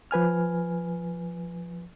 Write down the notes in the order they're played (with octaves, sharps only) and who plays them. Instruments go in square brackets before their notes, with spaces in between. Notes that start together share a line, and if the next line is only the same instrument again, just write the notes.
[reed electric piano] F3 B4 G#5 F6